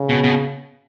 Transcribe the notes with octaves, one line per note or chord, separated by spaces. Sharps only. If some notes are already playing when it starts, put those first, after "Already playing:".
Already playing: C#3
B2
B2